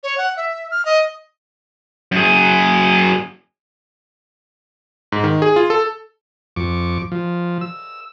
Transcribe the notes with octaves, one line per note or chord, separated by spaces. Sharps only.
C#5
F#5
E5
F6
D#5
F#2 G#4
G#2
D#3
G#4
F4
A4
F2 C#6 D6
F3
E6